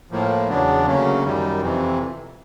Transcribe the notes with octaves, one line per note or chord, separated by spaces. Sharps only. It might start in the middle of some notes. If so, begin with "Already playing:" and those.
A2 F3 A#3
E2 C#3 F#3 B3 D4
D2 C#3 F#3 A#3 C#4
F#2 D#3 G3
F2 C3 E3